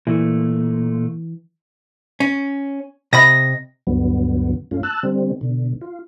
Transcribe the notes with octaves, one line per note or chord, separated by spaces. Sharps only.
A#2 E3 A3
C#4
C3 D#5 B5 A#6
D2 G2 D3 F#3 B3
F#2 A3 C#4 F4
A5 E6 F#6
D3 G3 C4
B2 D3
F4